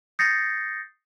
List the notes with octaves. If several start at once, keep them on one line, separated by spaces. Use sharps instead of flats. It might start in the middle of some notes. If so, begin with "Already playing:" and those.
D#6 G6 A6 A#6 C7 C#7